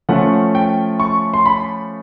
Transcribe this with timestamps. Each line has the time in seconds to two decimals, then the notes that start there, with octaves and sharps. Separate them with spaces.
0.09 F3 A3 C#4 F#5
0.55 G5
1.00 C#6
1.34 C6
1.46 B5